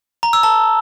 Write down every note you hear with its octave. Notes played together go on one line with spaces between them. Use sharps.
A#5
E6
A5